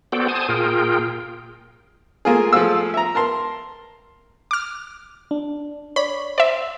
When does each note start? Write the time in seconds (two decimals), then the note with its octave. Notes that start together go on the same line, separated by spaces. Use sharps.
0.12 B3 F#4 A4 C5 D5 G5
0.29 C5 G#5 A5 D#6
0.49 A#2 F4 G#4 A#4 G5
2.25 A3 A#3 F4 G#4
2.53 F3 A3 G#4 F5 E6
2.94 E5 A#5
3.15 A#4 A5 C6
4.51 D6 F6
5.31 D4
5.96 C#5 D5 B5
6.38 C5 D5 E5